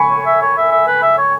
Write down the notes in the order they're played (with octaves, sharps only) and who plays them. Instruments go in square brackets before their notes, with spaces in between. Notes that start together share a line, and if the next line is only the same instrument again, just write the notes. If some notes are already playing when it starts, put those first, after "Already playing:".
Already playing: [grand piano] G#5 B5 C#6
[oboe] C#5
E5
C#5
E5
E5
B4
E5
C#5